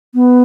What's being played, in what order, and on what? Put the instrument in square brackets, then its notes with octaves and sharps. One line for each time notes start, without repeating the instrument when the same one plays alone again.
[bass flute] B3